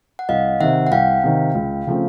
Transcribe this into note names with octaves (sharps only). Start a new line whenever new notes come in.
F#5
C2 D#5 F5
C3 D#3 E5 F#5
F#5
C2 F5 G5
C3 D#3
C#2
C#3 F3 A3 C4